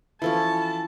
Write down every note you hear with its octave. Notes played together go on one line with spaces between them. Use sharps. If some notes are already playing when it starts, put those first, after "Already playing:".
E3 F3 C#4 E4 A4 A5